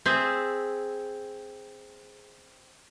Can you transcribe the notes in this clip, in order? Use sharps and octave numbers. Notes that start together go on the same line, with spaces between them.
C4 G#4 E5